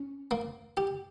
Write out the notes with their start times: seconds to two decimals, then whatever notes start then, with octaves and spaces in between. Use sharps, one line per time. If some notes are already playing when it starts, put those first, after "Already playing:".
Already playing: C#4
0.31 A#3
0.77 G4